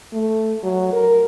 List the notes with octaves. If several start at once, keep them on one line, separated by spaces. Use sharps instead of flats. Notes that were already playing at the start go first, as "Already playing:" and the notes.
A3
F#3
A#4